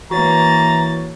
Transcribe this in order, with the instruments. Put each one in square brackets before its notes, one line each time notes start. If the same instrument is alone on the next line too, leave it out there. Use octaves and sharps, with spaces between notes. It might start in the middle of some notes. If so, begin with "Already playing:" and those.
[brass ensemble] E3 [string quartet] A#3 A6 [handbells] F#4 C#5 [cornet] A#5